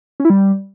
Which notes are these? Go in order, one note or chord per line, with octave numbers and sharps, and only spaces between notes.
C#4
E4
G3